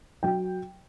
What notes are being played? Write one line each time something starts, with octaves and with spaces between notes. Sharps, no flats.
F#3 G5